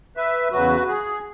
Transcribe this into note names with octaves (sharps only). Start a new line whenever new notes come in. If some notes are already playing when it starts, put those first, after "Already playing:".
B4 E5
E2 C#3 F#3 F#4 B4
G#4